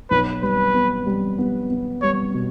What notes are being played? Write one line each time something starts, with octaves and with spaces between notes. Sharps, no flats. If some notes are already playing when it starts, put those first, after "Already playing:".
B1 B4
G3 B4
B3
G3
B3
B3
G3 C#5
B2